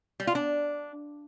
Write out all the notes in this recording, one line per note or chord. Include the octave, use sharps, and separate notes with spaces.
G3
F4
D4